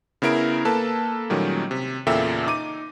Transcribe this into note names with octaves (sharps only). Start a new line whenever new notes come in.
C#3 B3 E4 A#4 D7
A#3 A4 B4 A5
A#2 D#3 F#3 G3 A3 C#4
C3
E2 A#2 C#3 A4 E5 G5
D#4 D6 D#7